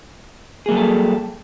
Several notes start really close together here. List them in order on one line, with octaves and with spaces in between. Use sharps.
G#4 A#3 F#3 G3 A4